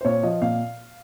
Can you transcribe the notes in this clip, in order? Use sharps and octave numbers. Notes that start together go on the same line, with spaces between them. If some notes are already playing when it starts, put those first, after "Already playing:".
C5
A#2 C#5
F3 D#5
A#2 F5